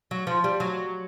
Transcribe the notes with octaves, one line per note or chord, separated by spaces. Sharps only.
F#3
F3
G3
F#3